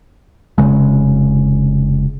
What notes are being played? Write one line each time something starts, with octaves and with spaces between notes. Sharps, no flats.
F1 C#2 C#3 G#3